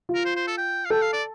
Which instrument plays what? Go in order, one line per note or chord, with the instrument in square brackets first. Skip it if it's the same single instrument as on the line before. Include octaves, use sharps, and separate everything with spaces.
[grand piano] F4
[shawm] A#4
C5
C5
A4
G5
F5
[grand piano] A4 [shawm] G5
[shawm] F5
D5